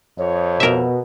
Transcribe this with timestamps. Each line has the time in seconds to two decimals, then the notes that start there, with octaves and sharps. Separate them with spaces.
0.18 F2 C#5
0.60 B2 A#4 E5